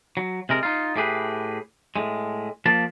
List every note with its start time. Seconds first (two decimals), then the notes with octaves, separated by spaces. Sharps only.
0.17 F#3
0.49 C3 G#3 A#4
0.63 D#4 F4
0.96 A2 G4 G#4 B4
1.96 A2 G#3
2.66 F3 A#3 A5